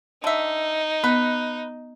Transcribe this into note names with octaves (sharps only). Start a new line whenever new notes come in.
D3 D#4 E5
B3 B4